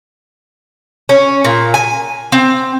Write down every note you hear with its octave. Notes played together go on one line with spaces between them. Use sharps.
C#4
A#2
G#5
C4